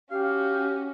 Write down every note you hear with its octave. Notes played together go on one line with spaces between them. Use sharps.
C#4 F#4 G4 F5